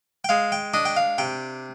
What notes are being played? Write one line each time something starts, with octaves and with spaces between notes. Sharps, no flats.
G5
G#3 F5
G5
D4 D#5
G5
F5
C3 G5